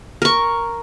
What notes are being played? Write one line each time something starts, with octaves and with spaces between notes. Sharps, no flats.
A#4 C#6